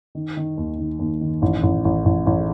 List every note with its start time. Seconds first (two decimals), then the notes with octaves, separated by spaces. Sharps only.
0.15 D#3
0.37 D#3
0.57 D#2
0.79 D#3
0.99 D#2
1.21 D#3
1.42 A1
1.63 A1
1.85 A1
2.05 A1
2.27 A1